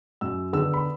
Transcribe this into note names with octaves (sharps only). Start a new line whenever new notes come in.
F#2 E6
D3 B3 D4 E6
B5